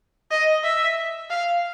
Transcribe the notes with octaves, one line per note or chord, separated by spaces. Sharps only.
D#5
E5
F5